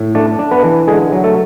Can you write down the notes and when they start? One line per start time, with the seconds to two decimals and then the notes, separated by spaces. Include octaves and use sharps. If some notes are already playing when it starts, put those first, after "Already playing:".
Already playing: A2
0.15 A3 D4 D5
0.39 D4
0.51 B3 B4
0.64 E3
0.87 D3 G#3 G#4
1.12 F#3
1.24 A3 A4